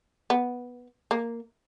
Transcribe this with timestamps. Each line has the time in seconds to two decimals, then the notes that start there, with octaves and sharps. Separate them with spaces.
0.30 B3
1.11 A#3